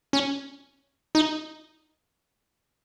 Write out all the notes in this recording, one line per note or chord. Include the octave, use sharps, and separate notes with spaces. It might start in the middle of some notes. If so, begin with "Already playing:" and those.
C#4
D#4